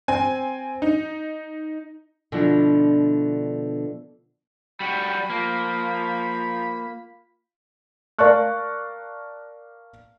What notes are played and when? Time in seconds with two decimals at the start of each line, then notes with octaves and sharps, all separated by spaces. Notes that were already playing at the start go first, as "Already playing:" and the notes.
0.08 C4 G#5
0.82 D#4
2.32 B2 D3 F3 D4 E4
4.80 G3 F#4 G5 B5
5.30 F3 A#3
8.19 A#4 D5 F5 A5 C#6 F#6